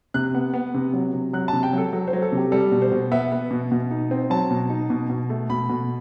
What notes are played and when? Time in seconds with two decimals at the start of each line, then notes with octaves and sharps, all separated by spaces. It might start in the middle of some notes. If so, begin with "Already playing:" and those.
0.14 C3 F#6
0.35 B3
0.54 B3
0.74 C3
0.94 F#3
1.14 C3
1.33 F#3 F#6
1.48 C3 A5
1.63 G5
1.73 F#3 A4
1.93 F#3 A4
2.07 C5
2.13 F#3
2.22 A4
2.32 C3 G4
2.52 G3 A4
2.72 B2
2.82 C5
2.92 B2
3.12 B3 E5
3.32 B3
3.51 B2
3.72 B2
3.91 D#4
4.11 C4
4.30 F#3 A5
4.50 B2
4.70 D#4
4.90 B2
5.09 B2
5.30 A3
5.50 B2 B5
5.69 B2